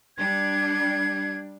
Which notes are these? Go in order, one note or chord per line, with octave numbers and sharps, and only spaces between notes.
G3 D4 G#6